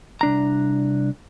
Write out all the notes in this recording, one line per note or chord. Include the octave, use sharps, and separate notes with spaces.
C2 D4 A#5